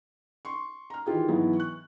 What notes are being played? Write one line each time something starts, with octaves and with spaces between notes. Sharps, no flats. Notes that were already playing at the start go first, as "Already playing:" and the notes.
C6 C#6
A#5 F6
D#3 E3 F4 G4 G#4
G#2 E3 F#3 B3 E4
C#6 F#6